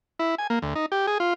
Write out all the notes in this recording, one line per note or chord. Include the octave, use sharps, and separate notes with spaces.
E4
G#5
A#3
D2
D#4
G4
G#4
F4